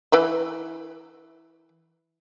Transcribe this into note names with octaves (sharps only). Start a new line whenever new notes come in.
E3 B4 E5